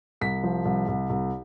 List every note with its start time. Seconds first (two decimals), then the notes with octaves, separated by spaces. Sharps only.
0.21 C2 B6
0.43 F3
0.65 C2
0.88 C2
1.10 C2